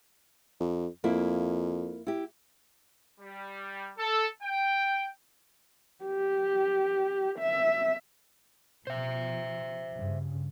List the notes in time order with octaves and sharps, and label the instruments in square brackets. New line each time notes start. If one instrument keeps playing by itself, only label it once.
[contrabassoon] F2
[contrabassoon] F2 [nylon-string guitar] A#3 E4
[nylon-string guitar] E4 G4
[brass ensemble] G3
A4
G5
[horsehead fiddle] G4
E5
[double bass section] B2 F3 [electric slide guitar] C5 E5
[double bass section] G2 C#3